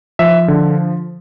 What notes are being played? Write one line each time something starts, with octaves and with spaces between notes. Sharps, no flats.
F3 E5
D3